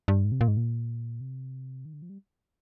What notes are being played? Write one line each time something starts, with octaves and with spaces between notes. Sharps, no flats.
G2
G#2
C3
A#2
G#2
A#2
C3
D#3
D3
F3
G3